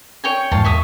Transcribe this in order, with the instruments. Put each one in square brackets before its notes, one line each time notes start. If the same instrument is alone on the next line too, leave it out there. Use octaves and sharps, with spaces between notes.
[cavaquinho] C#5 G5 G#5
[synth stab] E2 G#2 [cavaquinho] F4 A5
[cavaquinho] E5 C#6 D#6